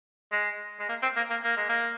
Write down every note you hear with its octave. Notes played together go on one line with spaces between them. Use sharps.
G#3
G#3
A#3
C4
A#3
A#3
A#3
G#3
A#3